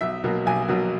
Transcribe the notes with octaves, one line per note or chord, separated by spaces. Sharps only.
B1 E5
B2 F#3 A#3
B1 G#5
B2 F#3 A#3